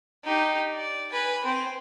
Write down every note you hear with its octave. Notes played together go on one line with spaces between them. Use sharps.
D#4 G4
D5
B4 G#5
C4 C5